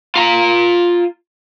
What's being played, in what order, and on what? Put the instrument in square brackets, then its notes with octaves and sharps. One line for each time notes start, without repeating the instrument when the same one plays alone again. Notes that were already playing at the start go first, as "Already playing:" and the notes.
[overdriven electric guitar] F4 A#5